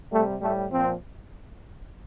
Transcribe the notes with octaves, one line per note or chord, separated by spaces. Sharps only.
C3 G3 A3
A2 G3 A3
A#2 F3 C4